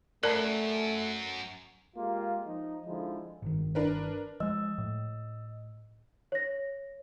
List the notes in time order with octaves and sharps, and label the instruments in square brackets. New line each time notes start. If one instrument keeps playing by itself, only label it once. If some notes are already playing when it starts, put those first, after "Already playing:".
[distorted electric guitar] F#2 [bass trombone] A3 [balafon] A#4 [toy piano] D5 A5 A#5
[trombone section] G#3 A#3 F4 G4
F3 D#4
D3 F3 G#3 D#4 E4
[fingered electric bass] G1 D#3
[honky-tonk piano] D4 A#4 B4
[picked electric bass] F3 G#3 [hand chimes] D#5 E6
[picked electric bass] A2
[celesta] C#5 A#6